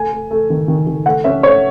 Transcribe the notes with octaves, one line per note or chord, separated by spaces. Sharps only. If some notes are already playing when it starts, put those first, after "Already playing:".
Already playing: A3 G#5
A3
A3
D#3
D#3
D#3
A3 F#5
C#4 E5
A3 C#5